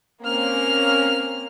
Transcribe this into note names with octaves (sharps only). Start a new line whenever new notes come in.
A#3 C4 C#4 F6